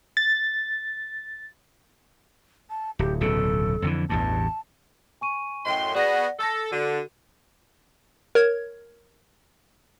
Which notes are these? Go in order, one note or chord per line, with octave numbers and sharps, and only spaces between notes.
A6
A5
D1 G4
D1 B1 C#3 A4
F2 D3 E3
A1 E2 G2 A5
G#5 C#6 D#7
F#2 A2 D#5 G5 C6
B3 F#4 G#4 D5 F#5 A#6
A4 E6 A#6
D3 F#4 A4 D#7
A#4 C#5 G#6